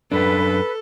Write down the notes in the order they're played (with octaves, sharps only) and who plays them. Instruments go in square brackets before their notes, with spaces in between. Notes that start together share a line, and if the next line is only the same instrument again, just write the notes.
[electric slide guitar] F#2 D4 [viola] A4 [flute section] B4